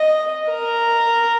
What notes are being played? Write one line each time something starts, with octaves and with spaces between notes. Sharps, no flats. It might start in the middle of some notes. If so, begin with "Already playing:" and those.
Already playing: D#5
A#4